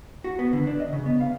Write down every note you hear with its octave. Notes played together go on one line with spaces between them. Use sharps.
F#4
B3
D3
D4
D#5
C#3
B3
F5